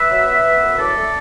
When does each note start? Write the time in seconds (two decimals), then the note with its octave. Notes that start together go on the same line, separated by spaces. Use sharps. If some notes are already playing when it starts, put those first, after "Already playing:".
Already playing: B4 E5
0.10 F#3
0.27 B3
0.44 B3
0.61 F#2
0.79 A2 A4 D5
0.96 A3